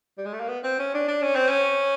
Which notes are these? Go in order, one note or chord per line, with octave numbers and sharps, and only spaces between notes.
G3
G#3
A3
A#3
B3
C4
C#4
D4
D4
C#4
C4
C#4